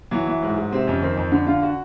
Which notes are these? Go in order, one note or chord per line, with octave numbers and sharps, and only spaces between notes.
E3 F#3
E3
G#2
G#2
C3 C4
F2 C#4
D#3 C4
F2
D3
D3 F4
F#4